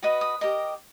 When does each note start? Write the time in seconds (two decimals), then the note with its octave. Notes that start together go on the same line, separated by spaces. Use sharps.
0.03 F#4 B4 D#5 D#6
0.21 D#6
0.41 G4 A#4 D#5